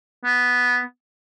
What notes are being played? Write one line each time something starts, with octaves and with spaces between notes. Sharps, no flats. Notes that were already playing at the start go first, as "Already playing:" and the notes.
B3